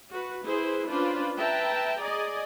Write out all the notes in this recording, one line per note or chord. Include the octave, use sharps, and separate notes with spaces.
F#4 B4
E4 G#4 B4 C5
C#4 D4 F4 B4 C5 D5
B4 E5 G5 A5 A#5
G#4 D5 D#5 G#5